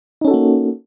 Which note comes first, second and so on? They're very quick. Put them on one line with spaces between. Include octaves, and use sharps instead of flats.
D#4 C#4 A4 F#4 A#3